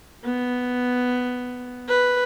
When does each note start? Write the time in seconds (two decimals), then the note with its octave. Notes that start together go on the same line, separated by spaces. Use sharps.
0.25 B3
1.89 B4